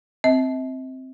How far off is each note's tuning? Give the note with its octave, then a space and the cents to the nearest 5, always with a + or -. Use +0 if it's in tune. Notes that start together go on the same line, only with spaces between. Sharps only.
C4 +0 E5 -45